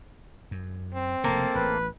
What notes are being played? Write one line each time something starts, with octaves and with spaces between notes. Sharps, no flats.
F#2
C4
F1 C#3 A3 A#3
A1 B4